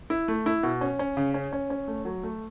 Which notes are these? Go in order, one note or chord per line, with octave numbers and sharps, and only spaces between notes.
E4
A3
E4
B2
C#4
C#4
C#3
C#4
C#4
C#4
A3
F#3
A3